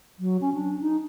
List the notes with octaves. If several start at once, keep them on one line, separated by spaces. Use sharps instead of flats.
F#3
C#4
D4
D#4